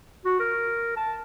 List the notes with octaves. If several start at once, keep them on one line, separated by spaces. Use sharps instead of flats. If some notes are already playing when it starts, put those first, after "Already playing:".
F#4
A#4
A5